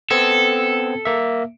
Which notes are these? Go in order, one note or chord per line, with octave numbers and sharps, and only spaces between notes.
B3 C4 A4 G#6
A#3 E5